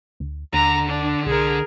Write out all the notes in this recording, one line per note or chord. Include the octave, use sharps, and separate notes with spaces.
D2
D#2 D3 A#5
D4
C2 G#4 A#4